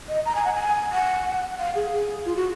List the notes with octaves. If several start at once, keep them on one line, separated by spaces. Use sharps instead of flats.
D#5
A#5
G#5
F#5
G#5
F#5
F5
G#4
G#4
F4
F#4